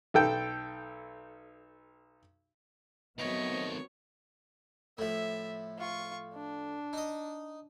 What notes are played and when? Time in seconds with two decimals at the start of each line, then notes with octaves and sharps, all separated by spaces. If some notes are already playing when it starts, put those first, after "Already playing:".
0.14 B1 A4 G5
3.19 D#3 F#3 A3 B3 C4 C#5 D#5
4.98 A2 F3 E5
5.78 F4 C#6
6.34 D4
6.93 D#4 D#5